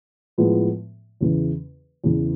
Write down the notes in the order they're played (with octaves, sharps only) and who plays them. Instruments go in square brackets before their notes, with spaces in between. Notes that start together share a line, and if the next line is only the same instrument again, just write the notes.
[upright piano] A2 F3 G#3 B3
E2 C#3 E3
E2 C#3 E3